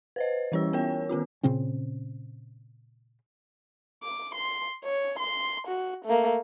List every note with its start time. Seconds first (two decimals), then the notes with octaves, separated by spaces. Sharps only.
0.16 B4 C5 D#5
0.52 E3 G3 C#4 E4 C#5 E6
0.73 B3 A#4 C#5 G5
1.09 D#3 B3 C#4 F4
1.43 A#2 C#3 C4 C#4
4.03 D6
4.35 C6
4.85 C#5
5.19 C6
5.67 F#4
6.05 A3 A#3